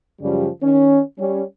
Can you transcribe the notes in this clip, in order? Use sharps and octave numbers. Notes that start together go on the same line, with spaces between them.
F#2 C#3 F3 G3
D#3 C#4
G3 C#4